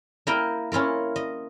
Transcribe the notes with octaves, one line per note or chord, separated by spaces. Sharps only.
A#3 E4 A#4 G5
C#4 E4 F4 A#4
D#5